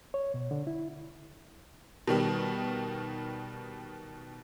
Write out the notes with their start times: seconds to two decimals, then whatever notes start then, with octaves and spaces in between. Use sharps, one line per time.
0.14 C#5
0.34 B2
0.51 D3
0.67 E4
2.07 B2 D#3 G3